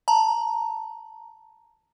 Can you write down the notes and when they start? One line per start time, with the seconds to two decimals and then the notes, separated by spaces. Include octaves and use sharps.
0.08 A5 A#5